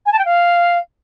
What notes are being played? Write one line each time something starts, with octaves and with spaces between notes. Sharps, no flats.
G#5
A5
G5
F5